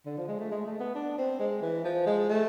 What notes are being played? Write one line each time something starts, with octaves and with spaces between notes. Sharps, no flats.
D3
F3
G#3
A3
G#3
A3
B3
D4
C4
G#3
E3
F3
G#3
A3